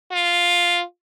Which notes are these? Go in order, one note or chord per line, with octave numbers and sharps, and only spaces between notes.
F4